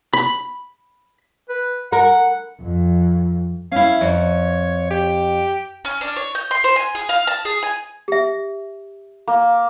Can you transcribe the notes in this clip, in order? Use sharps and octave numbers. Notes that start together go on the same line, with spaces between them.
B5
B4
A#4 F#5
F2
C#4 E4 F5
F2 C#5
G4
C#4
D4
C#5
G6
C6
C5
G#5
G#4
F5
A5
G#4
G#5
G4 E5
A#3